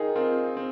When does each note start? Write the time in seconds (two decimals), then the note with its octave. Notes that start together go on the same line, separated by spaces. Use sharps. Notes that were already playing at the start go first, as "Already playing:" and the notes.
Already playing: D#3 D#4 F4 G#4 A#4
0.16 C4 F4
0.57 C4